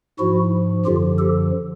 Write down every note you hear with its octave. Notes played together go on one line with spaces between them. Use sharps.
G#2 F3 E4 F#4
F#2 D3 F3 F4 G4
G4 A4